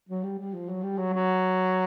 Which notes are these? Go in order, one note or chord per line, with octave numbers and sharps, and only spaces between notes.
F#3
G3
G3
F3
F#3
G3
F#3
F#3